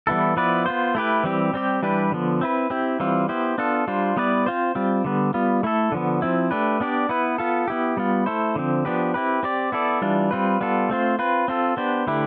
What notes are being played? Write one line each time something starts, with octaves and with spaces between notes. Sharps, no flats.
E3 G3 B3 E4 A4
F3 B3 E4 B4 D5
B3 F4 C5
A3 E4 G4 B4
E3 G3 C4 G4
G3 C4 G4
E3 G3 D4 G4 B4
D3 F3 B3
C4 E4 B4
C4 E4 G4
E3 G3 C4 F4
B3 E4 G4 C5
B3 D4 F4 A4
G3 D4 F4 C5
G3 B3 E4 B4 D5
C4 F4 C5
G3 C4 F4
D3 G3 B3
G3 B3 F4
A3 E4 A4
D3 F3 B3
F3 C4 E4
A3 D4 G4 B4
B3 D4 G4 D5
B3 E4 B4
B3 F4 A4
B3 E4 G4
G3 B3 F4
A3 E4 A4 C5
D3 F3 C4
F3 B3 D4 G4 B4
C4 E4 G4 B4
C4 G4 D5
B3 E4 A4 D5
E3 G3 D4 F4
G3 C4 F4 B4
G3 B3 F4 A4
A3 C4 F4 C5
C4 F4 B4
C4 F4 A4
B3 D4 G4 C5
D3 A3 E4 G4 B4